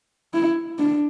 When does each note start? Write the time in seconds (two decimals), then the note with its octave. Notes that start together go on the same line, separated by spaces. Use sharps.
0.34 E4
0.78 D4